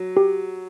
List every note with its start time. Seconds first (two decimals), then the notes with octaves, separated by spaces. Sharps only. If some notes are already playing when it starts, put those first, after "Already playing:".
Already playing: F#3
0.17 G4